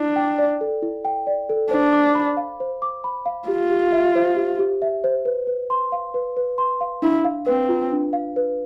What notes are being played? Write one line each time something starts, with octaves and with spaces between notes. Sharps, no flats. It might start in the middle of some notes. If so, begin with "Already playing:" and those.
Already playing: D4 E4
G5
D5
A4
E4
G5
D5
A4
D4 C5
D6
B5
F5
C5
D6
B5
F5
F4 G4
G4
E5
C5
G4
G4
E5
C5
B4
B4
C6
F5
B4
B4
C6
F5
D4 E4
F5
C4 B4
F4
D4
F5
B4